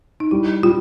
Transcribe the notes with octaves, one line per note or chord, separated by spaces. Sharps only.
D#4
G3 E4
G3 F4